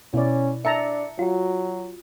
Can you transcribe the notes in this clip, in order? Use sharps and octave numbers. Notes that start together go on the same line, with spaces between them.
B2 C#4 E4 D5
D4 E5 A5 A#5 C#7
F#3 F4 F#4